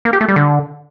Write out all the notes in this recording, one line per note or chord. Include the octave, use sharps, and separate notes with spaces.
A#3
G4
A3
G3
D3